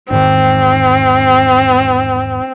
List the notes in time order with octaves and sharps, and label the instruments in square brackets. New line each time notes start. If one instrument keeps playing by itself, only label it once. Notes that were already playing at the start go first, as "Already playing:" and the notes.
[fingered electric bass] E1 G#2 D#3 [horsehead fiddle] C4